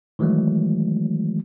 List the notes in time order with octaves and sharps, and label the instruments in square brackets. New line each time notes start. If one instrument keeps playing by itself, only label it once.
[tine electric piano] D#3 E3 F#3 G#3 A3